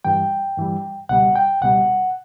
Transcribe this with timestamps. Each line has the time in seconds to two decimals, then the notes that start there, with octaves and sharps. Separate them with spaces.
0.05 G2 E3 G3 G5
0.57 G2 E3 G3
1.09 C#2 B2 G3 F#5
1.36 G5
1.61 C#2 B2 G3 F#5